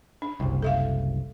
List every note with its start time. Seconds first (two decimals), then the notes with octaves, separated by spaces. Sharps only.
0.22 D4
0.40 F#1 C2
0.62 A4 E5 F5